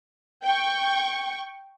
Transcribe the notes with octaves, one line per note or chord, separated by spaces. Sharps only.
G5 C#6